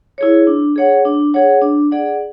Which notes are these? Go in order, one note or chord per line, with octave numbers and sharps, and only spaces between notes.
E4 G#4 C#5
D4
G#4 C#5 F#5
D4
G#4 C#5 F#5
D4
G#4 D5 F#5